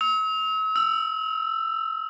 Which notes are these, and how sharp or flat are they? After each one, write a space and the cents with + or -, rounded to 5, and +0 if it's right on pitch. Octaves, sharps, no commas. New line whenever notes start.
E6 -45
E6 +15